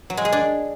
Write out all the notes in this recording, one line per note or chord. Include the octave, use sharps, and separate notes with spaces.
F#3
G#3
G#4
D4